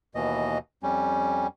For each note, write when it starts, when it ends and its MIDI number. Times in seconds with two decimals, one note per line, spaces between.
0.15 0.58 39
0.15 0.58 47
0.15 0.58 52
0.15 0.58 75
0.83 1.47 41
0.83 1.47 55
0.83 1.47 61